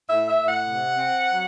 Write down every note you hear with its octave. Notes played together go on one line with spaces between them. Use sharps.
A2 E5
E5
A2
F#5
C3
C4
F#3